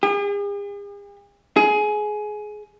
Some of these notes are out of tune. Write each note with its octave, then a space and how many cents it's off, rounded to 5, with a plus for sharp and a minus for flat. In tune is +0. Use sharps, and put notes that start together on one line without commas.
G#4 -45
G#4 +20